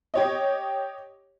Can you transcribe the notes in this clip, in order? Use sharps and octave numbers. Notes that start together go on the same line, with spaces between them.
G4 C#5 D#5